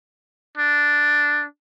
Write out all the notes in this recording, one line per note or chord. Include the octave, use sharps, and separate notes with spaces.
D4